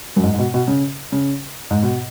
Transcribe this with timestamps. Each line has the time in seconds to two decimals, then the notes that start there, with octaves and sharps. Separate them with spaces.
0.16 F#2
0.23 G#2
0.34 G#2
0.39 B2
0.54 B2
0.68 C#3
1.12 C#3
1.71 G#2
1.83 B2